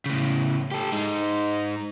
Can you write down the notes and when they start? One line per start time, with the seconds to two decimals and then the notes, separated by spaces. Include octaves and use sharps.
0.06 A2 C#3
0.72 G4 A4
0.92 G#3 D#4